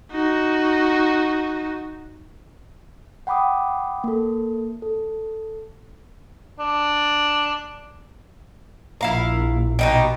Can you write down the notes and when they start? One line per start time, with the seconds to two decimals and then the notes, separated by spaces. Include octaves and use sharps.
0.11 D#4 F#4
3.27 F#5 G5 B5 D6 D#6
4.04 A#3 A4
4.82 A4
6.59 D4
9.01 A#1 E4 F5 A#5
9.79 B2 D#4 G4